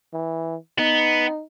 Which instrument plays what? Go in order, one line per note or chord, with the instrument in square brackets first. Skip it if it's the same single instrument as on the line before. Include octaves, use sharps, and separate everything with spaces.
[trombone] E3
[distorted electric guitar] B3 [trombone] D#4